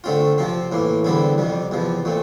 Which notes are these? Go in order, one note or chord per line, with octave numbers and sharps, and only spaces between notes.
D3 A3 C4 F4
C3 F3 C4
A2 E3 A#3
E2 D3 G3 C4 E4
F2 C3 G3
E2 C3 F3
A#2 A3 C4